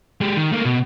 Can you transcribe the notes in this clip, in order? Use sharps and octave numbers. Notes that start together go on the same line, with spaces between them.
G#3 G4
D#3
A3 A#3
B2